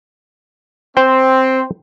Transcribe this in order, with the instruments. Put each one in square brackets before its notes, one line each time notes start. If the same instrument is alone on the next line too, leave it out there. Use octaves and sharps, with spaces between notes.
[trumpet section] C4 [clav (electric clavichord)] C5 G5